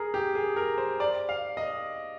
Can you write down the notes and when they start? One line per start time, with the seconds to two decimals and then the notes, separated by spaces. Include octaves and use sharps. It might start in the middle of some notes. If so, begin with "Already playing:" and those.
Already playing: G#4 A#4
0.14 G4
0.35 G#4
0.56 A#4
0.78 C5
1.00 D5
1.29 F5
1.57 D#5